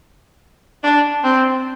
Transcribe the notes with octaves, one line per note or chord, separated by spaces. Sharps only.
D4
C4